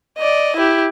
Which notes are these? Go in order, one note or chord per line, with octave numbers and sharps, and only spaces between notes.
D5 D#5
E4 G4